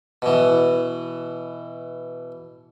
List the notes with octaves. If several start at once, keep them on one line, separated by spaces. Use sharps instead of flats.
B2 E3